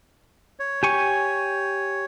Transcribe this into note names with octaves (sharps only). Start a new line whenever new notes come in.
C#5
G4 G#5 C#6